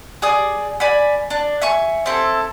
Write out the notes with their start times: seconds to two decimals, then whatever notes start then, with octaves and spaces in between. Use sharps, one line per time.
0.22 G#4 D5 D#6
0.80 D5 G#5 B5
1.30 D4
1.62 E5 G#5 C#6
2.06 C4 E4 A4